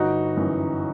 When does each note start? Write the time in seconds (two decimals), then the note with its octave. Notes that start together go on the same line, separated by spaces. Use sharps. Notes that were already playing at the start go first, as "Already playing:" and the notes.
Already playing: G1 D#4 F#4
0.37 F#2 E3